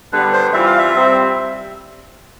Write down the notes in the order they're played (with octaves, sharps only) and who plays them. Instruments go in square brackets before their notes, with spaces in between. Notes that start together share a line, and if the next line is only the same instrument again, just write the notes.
[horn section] D3 G3 B3 [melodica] B4
[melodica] C5
[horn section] E3 G3 C4 F4 [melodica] E5
[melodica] F5
E5
[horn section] C3 G3 C4